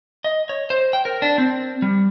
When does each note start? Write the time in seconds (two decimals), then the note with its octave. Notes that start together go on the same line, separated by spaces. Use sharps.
0.24 D#5
0.49 C#5
0.70 C5
0.93 G5
1.05 A#4
1.22 D4
1.38 C4
1.82 G3